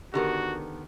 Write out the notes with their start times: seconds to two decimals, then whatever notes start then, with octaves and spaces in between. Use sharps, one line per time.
0.14 D3 D#3 B3 F#4 G4 A#4